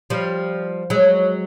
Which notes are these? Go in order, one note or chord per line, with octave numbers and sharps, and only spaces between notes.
F3 G3
F#3 G#3